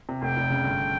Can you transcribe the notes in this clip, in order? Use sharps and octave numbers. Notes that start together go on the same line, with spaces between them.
C3
F1 G5
F1
C#3
G1